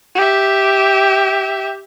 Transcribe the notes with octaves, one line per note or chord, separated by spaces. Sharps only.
G4 E5